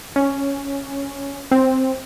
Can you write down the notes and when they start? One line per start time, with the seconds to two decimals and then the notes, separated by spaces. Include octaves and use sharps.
0.16 C#4
1.51 C4